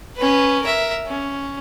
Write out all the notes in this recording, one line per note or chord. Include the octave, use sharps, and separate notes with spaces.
C#4 B4
A#4 E5
C#4